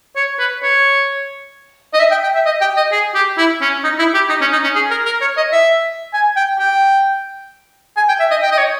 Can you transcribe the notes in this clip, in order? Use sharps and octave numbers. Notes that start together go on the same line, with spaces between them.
C#5
B4
C#5
D#5
E5
G5
G5
E5
D#5
G5
D#5
G#4
G4
E4
C#4
D#4
E4
G4
D#4
C#4
D#4
C#4
G#4
A#4
A#4
C#5
D#5
E5
G#5
G5
G5
G#5
G5
E5
D#5
G5
D#5
C#5